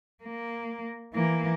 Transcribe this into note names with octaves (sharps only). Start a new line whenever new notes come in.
A#3
E3 A#3